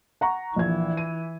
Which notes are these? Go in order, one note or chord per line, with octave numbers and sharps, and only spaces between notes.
F#5 A#5 C#6
A#1 E3 G#6
D#7